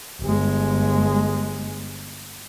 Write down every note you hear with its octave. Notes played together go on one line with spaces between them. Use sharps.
G1 G#3